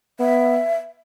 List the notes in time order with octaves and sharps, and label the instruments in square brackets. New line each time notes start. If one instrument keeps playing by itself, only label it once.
[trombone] B3 [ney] E5